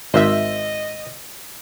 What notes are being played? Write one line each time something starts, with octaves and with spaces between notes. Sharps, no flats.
G#1 C5 D#5 E5